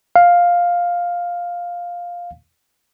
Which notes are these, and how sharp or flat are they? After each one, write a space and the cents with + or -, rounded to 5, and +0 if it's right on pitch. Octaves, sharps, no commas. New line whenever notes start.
F5 +5